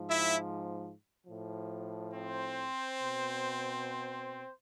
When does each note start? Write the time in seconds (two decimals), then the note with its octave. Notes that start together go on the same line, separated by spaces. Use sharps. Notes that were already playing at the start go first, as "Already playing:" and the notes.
Already playing: G#2 F3
0.09 E4 E5
1.26 A2 F3
2.13 C4 C5
3.01 B2